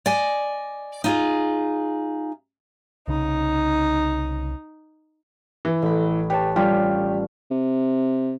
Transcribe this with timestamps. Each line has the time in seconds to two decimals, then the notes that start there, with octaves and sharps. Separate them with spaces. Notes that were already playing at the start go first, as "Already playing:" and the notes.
0.06 D5 D#5 G#5
1.04 D#4 F4 G#4
3.08 C2 C#3 D#4
5.65 E3
5.82 A1 B5
6.30 G4 B4 C#5 A5
6.56 G3 C#4 F4 G4
7.51 C3